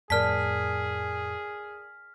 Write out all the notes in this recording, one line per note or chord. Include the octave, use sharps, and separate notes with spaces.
F2 A2 G#4 A#4 D5 A5 F6 B6